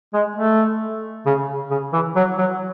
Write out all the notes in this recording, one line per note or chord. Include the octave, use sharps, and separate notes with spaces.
G#3
A3
C#3
C#3
E3
F#3
F#3